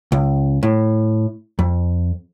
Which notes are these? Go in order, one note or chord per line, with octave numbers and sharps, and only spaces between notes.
C#2
A2
F2